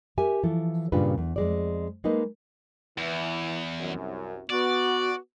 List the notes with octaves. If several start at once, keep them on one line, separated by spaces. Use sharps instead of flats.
G4 A#4 E5 G#5
E3 F3 E4 A4
G2 A#2 C#3 D4 F4 B4
E2
F2 G#3 D5
G#3 A#3 D#4 B4 D#5
E2 E3
C2 F#2
B3 F#4 D5